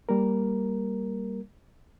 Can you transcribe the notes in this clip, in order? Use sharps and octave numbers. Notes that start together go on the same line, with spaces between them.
G3 A#3 A#4